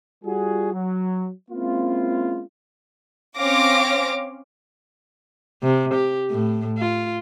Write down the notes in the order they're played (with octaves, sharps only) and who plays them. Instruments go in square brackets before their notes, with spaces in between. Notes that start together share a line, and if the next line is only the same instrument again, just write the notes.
[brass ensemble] G3 F4 F#4 G#4
F#3
G#3 A#3 C4 C#4 E4 F4
[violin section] C4 C#4 C#5 F5 D6 A#6
[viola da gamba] C3
G4
A2
F4